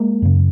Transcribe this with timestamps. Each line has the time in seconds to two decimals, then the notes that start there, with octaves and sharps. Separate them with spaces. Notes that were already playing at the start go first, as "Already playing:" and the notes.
Already playing: G#3 A#3
0.22 F#2 C#3